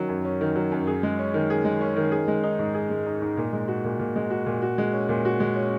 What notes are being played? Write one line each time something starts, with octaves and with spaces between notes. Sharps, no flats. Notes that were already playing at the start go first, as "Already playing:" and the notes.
Already playing: D#3 F#3 C#4
F#2
C#4
D#3
F#3
F#2
G#4
G#3
C#4
D#3
G#4
G#3
C#4
D#3
G#4
G#3
D#4
G#2
G#4
G#3
D#4
G#2
A#2
G#3
F#4
A#2
A#2
G#3
F#4
A#2
F#4
G#3
C#4
A#2
F#4
G#3
C#4